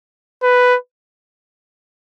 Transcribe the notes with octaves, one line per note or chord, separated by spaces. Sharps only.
B4